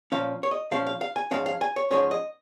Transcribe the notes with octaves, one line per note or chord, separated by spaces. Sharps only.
A#2 F3 C#4 F5
C#5
D#5
A#2 F3 C#4 F5
F5
F5
G#5
G#2 F3 G#3 C#4 F5
F5
G#5
C#5
G#2 F3 G#3 C#4 C#5
D#5